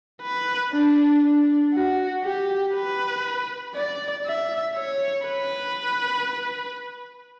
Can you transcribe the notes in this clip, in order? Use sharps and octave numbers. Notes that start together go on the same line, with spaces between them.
B4
D4
D4
F#4
G4
B4
D5
E5
C#5
B4